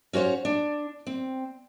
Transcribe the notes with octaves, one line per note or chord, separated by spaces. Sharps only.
C#4 F#4 C5 C#5 F5
D4
C4